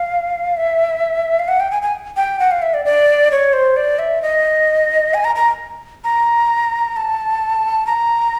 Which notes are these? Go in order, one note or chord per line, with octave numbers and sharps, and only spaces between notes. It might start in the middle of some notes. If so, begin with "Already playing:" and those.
Already playing: F5
E5
F5
F#5
G5
G#5
G#5
G5
F#5
F5
E5
D5
D5
C#5
C5
D5
E5
D#5
G#5
A#5
A#5
A#5
A5
A#5